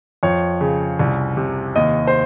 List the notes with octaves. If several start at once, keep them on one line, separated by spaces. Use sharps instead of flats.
F2 C#5
C#3
C2
C3
D#2 D#5
C5